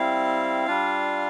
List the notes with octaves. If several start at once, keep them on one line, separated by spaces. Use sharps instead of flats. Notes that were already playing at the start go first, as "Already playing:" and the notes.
Already playing: G3 C4 E4 F5
G3 D4 F4